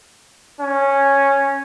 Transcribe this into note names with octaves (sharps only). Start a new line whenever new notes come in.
C#4